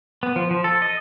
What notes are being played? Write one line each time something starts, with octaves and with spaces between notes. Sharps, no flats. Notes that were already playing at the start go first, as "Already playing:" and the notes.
B3
F3
F3
A4
D#5